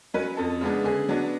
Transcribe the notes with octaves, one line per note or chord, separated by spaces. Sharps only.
F#3 C#4 B4
F2 A4
C#3 G#3 B3 D4
D3 G#4
F#3 B3 D4